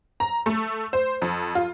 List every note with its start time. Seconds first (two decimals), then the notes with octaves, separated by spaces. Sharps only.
0.20 A#5
0.46 A3
0.93 C5
1.22 F2
1.55 F4